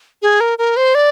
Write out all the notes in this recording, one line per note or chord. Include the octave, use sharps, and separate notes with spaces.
G#4
A#4
A#4
C5
D5